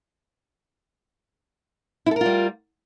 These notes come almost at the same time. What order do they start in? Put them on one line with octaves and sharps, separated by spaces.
E4 A4 A#4 F4 G3